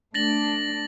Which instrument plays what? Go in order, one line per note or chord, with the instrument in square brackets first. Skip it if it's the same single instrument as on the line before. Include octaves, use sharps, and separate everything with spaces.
[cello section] A3 D4 [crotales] A6 A#6 F#7